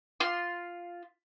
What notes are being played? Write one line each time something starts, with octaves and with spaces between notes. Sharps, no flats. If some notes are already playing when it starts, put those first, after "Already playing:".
F4 C6